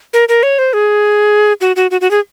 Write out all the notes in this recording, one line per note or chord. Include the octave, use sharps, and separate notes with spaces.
A#4
A#4
C#5
C5
G#4
F#4
F#4
F#4
F#4
G#4